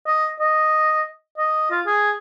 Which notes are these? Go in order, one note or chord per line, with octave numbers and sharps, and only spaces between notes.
D#5
D#5
D#5
F4
G#4